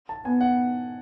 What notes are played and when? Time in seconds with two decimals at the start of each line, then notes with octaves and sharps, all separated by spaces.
0.09 A5
0.25 B3 G#5
0.41 F#5